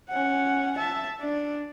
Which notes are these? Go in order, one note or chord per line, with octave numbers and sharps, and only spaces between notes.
C#4 F#5
E5 A5
D4